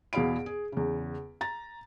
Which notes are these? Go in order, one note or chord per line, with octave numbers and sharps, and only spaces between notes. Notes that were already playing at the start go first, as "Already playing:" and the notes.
E2 B2 G#4 F5 B5 D7
G#4
E2 C#3
A#5 A6